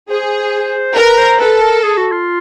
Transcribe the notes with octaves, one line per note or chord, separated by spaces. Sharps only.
G#4 C5
A#4 B4
C5
A4 B4
A#4
G#4
F#4
F4